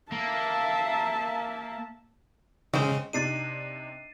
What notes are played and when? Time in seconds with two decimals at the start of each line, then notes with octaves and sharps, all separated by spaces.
0.12 A#3 E5 A5
2.74 C#3 G#3 C4 C5
3.13 C3 D4 D#4 A6 C7 D#7